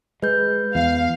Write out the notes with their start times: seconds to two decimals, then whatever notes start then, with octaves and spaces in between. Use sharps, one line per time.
0.22 G#3 B4 G6
0.75 E2 F5